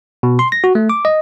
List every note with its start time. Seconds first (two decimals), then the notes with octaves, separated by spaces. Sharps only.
0.23 B2
0.39 C6
0.52 A#6
0.64 F#4
0.75 A3
0.90 D6
1.05 D#5